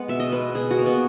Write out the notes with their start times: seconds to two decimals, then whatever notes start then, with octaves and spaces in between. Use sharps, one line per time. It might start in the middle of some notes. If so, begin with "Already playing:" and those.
Already playing: G#3 B3 F#5
0.08 B2 E5
0.20 D#5
0.32 G#3 B3 B4
0.55 B2 G#4
0.71 F#4
0.78 A#3
0.86 B3